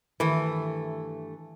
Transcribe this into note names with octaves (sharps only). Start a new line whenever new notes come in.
G2 D#3 E3 A3